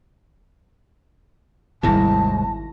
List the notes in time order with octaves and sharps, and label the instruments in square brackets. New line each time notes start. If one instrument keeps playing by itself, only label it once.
[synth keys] G#1 E4 A#6 [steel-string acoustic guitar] D#2 G#2 [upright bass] C3 G3 [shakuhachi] A5